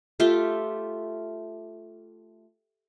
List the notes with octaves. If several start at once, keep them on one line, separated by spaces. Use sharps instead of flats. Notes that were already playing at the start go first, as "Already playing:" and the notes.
A3 F4 G4 E5